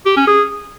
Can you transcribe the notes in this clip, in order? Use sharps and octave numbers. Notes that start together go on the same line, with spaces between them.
G4
C#4
G#4